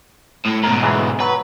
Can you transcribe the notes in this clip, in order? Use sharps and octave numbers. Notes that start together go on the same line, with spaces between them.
A2
G#2 B2 A#4
E3 G#3
F#3 B4